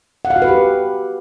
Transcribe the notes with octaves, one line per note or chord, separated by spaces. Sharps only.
F#5
F5
F#4
B4
G4